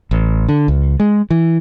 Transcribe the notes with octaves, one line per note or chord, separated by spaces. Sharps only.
A1
D3
C#2
G#3
E3